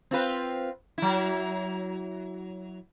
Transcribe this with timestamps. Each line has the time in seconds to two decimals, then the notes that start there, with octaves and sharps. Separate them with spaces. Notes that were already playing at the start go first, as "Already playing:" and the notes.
0.11 C4 F4 B4
0.98 F#3 E4